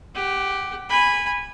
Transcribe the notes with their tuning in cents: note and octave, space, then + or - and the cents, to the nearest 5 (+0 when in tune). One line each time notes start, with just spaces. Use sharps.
G4 +0 F#5 +25
G#5 -15 B5 +0